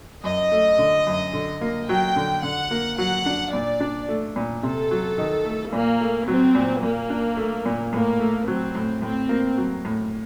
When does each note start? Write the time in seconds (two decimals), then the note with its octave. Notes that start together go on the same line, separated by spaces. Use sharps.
0.23 F#2 D#5
0.52 A3
0.78 D3
1.07 F#2
1.33 D3
1.61 A#3
1.88 F#3 G5
2.16 D3
2.43 D3 F#5
2.71 A#3
2.98 F#3 F#5
3.26 D4
3.53 A#2 D5
3.80 D4
4.08 A3
4.36 A#2
4.63 C3 A4
4.91 F#3
5.18 D#3
5.45 A3
5.72 A#2 A#3
6.01 A3
6.28 F#3 C4
6.55 A#2
6.82 A#2 A#3
7.10 D4
7.37 A3
7.66 A#2
7.93 A2 A#3
8.20 A3
8.48 F#3 C4
8.75 A2
9.02 A2 C4
9.29 A#3
9.58 F#3
9.85 A2